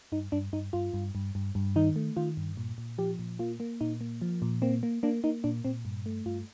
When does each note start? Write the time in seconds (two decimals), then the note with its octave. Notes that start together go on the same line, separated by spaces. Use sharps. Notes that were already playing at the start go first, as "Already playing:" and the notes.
0.12 G2 D#4
0.32 G2 D4
0.53 G2 D#4
0.73 G2 F4
0.94 G2
1.15 G2
1.35 G2
1.55 G2
1.76 D#3 D#4
1.96 A3
2.17 D#3 F4
2.37 G2
2.57 A#2
2.78 A#2
2.98 F3 G4
3.19 A#2
3.39 A#3 F4
3.60 A#3
3.81 A#2 D#4
4.01 A#3
4.22 F3
4.42 A#2
4.62 A#3 C4
4.83 A#3
5.03 A#3 D4
5.24 A#3 D#4
5.44 A#2 D4
5.65 A#2 C4
5.85 G2
6.06 A3
6.26 G2 F4